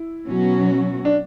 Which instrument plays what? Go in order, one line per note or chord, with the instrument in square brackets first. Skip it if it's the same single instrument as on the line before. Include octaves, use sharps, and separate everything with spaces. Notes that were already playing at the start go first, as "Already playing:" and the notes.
Already playing: [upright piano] E4
[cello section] B2 F#3 C#4 F#4
[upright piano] D4